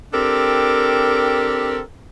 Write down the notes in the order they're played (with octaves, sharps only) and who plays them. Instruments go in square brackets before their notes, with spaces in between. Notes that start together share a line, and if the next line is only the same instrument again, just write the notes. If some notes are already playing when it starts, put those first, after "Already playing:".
[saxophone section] C4 D4 G4 A4 A#4